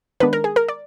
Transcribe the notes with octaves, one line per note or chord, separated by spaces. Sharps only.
D#3 G#3 B3 D4 B4
A#4
G#4
A#4
D5